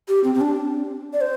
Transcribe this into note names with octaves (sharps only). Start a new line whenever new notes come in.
G4
C4
C4
D4
D5
C5